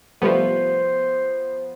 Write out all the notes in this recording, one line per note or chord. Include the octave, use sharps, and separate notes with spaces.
F3 G3 A3 B3 C5